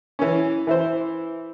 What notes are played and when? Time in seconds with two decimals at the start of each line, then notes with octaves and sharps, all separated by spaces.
0.19 E3 C#4
0.67 E3 E4 C5